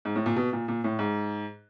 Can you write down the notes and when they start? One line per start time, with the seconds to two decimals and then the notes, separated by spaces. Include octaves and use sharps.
0.05 G#2
0.16 A2
0.26 A#2
0.36 B2
0.53 A#2
0.68 A#2
0.84 A2
0.99 G#2